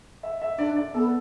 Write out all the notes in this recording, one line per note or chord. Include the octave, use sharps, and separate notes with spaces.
E5
E5
D4 D5
D5
B3 A4